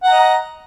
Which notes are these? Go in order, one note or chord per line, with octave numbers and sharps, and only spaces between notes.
D#5 F#5 A#5